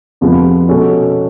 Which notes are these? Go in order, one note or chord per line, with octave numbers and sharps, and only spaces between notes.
F2 C3 F3 G#3 B3
B2 G#3 C#4 F#4 A4